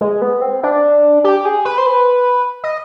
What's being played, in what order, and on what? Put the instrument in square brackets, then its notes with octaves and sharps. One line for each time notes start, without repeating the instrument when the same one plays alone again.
[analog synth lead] G#3
B3
C4
D4
G4
G#4
B4
C5
B4
D#5